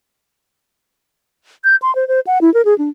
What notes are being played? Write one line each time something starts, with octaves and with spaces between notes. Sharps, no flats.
G6
C6
C5
C5
F#5
E4
A#4
G#4
D4